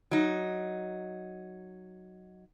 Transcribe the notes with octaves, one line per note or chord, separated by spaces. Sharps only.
F#3 D#4